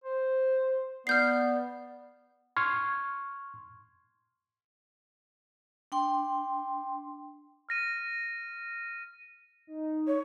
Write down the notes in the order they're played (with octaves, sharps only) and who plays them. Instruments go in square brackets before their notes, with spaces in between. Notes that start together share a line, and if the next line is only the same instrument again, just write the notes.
[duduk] C5
[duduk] B3 [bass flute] D5 [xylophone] F6 G6 C7
[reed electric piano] C6 C#6 F6 G#6
[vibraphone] D4 G5 C6
[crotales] F6 A#6 D#7
[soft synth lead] D#4
[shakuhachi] C#5